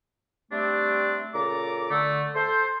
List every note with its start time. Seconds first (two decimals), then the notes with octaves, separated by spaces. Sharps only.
0.52 G3 A3 C4 D4
1.34 A#2 C#3 A4 A#5 D6
1.91 D3 A3
2.35 A4 C5